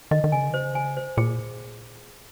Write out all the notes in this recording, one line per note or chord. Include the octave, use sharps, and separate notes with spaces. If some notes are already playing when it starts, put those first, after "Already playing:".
D#3 D#5
D#3
C#3 G#5
D#3
C#3 C5
G#5
C5
A#2 G#4